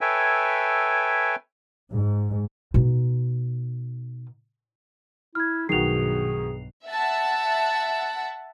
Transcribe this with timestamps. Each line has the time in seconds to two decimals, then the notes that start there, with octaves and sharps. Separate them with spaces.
0.01 A4 B4 C#5 E5 G5 G#5
1.92 G#2
2.74 B2 D#4
5.35 E4 F6 G#6
5.69 B1 G2 B2 D#3 F#4 G#4 C7 F7
6.87 E5 F#5 A5